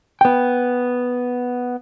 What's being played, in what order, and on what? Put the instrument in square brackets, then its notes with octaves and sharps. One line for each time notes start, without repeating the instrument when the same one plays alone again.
[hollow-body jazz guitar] B3 G5